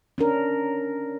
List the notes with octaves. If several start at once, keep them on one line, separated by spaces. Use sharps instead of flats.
C#4 D4 A#4